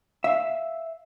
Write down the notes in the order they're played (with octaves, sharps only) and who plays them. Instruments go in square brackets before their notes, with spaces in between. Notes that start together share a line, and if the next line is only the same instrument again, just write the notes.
[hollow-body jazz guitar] E5 F5